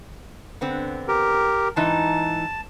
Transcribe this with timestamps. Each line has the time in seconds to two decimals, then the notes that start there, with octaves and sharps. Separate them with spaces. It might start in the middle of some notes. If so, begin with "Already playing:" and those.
0.61 D3 B3 C4
1.08 G4 A#4
1.76 G#2 E3 D#4 A5